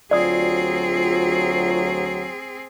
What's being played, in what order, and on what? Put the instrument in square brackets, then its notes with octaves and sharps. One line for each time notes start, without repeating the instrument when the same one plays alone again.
[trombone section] D2 F#3 [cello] C4 G#4 [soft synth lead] F4 [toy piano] D5 D#6